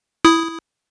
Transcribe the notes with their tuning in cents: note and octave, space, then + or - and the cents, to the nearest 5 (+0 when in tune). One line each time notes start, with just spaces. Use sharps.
E4 +0 D#6 +5